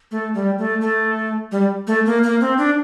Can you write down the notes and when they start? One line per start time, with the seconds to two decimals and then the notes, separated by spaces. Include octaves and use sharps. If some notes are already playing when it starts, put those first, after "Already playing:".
0.11 A3
0.34 G3
0.58 A3
0.81 A3
1.52 G3
1.87 A3
2.06 A#3
2.23 A#3
2.41 C4
2.58 D4